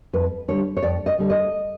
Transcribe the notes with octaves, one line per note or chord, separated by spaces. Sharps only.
F2 B4
D3 G3 C#5
C#5
F2 D5
D#5
D3 G3
D#5